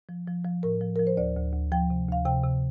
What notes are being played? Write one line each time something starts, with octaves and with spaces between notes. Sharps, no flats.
F3
F3
F3
A2 A#4
F3
F3 A#4
C5
D2 D5
D2
D2
F3 G5
C3
D2 F5
C3 G5
C3